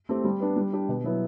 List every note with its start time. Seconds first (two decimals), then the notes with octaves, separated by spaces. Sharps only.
0.09 A3 C4 G4
0.24 G3
0.40 B3 D4
0.56 G3
0.73 D4 G4
0.88 B2
1.04 F#3 B3 E4